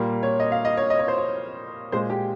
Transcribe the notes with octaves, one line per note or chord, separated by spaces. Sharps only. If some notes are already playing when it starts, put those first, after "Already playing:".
Already playing: A#2 G3 A#3
C#5
D#5
F5
D#5
C#5
D#5
C#5
C5
C#5
A#2 G#3 C5
G4